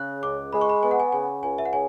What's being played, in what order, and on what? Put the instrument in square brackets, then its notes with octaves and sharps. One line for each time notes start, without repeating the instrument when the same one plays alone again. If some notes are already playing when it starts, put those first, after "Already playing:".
Already playing: [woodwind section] C#3 [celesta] F#6
[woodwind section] C#2 [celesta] D6
[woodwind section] G#3 [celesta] B5
[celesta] C#6
B5
[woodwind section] B3 [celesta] G#5
[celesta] F#5
G#5
[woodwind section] C#3 [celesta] G#5
[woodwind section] C#2 [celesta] G#5
[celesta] E5
F#5
[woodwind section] C#3 [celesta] G#5